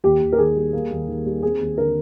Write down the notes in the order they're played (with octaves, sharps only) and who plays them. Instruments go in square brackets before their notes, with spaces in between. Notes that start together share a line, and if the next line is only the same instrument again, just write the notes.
[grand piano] D#2 [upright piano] G4
[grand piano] D#2
[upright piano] A#4
[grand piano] D#3 [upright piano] G#4
[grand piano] G3
A#3
D#2
D#3
G3
[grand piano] C4 [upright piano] G#4
[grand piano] D#2
[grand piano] D3 [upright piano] A#4